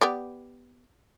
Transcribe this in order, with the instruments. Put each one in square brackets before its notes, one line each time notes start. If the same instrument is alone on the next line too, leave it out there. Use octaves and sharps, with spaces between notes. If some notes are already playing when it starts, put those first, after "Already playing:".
[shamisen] B3 G4 D5